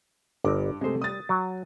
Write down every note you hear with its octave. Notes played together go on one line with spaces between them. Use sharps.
G1 G2 D#5 D6
C3 G#3 A3 C5
G3 D#6 A6
F#3